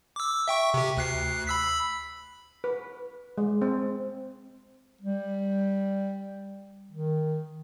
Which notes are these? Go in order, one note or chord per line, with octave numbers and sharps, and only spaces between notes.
D6 E6
E5 G5 C#6
C3 G4
D2 F#6 C7
B5 E6 B6
B4
G#3
C4
G3
D#3